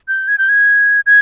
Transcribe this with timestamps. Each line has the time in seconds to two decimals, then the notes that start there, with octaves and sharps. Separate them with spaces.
0.08 G6
0.28 G#6
0.38 G6
0.49 G#6
1.06 G#6